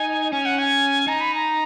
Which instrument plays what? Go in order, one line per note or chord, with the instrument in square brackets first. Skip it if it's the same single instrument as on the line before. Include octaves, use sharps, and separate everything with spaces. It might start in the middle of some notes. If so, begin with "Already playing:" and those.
Already playing: [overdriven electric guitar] D#4 [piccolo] G#5
[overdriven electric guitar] C#4 [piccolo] G#5
[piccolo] F#5
G#5
[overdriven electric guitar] D#4 [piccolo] A#5
[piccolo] B5
A#5